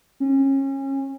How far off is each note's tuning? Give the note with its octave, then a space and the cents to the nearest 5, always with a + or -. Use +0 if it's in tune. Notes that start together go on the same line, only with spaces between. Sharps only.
C#4 -30